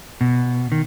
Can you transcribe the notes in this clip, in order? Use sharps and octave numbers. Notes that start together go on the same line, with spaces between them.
B2
D#3